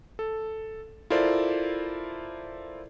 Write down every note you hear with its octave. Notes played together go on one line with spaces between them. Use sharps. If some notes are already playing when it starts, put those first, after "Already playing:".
A4
E4 F4 A4 A#4 C5 D5